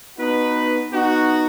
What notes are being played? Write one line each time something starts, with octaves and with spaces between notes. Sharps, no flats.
B3 D#4 F#4 B4
B3 D#4 F#4